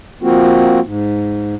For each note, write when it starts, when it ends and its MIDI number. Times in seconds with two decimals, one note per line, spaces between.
0.22 0.80 53
0.22 0.80 58
0.22 0.80 60
0.22 0.80 65
0.22 0.80 66
0.84 1.55 44